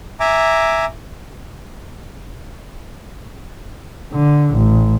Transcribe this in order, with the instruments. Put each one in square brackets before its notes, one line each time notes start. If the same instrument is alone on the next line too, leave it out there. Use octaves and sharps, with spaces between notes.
[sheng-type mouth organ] E5 G#5 A#5 D6
[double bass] D3
A1